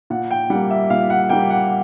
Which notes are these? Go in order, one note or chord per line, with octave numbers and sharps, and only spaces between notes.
A#2 F#5
G5
G3 F#5
A#3
E5
A#2 F5
F#5
G3 A#3 G5
F#5